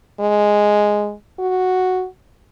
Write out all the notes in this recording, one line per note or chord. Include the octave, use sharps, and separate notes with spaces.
G#3
F#4